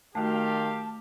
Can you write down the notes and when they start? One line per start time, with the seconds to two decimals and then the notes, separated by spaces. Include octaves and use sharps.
0.15 D#3 A3 F#4 G4 F5 A5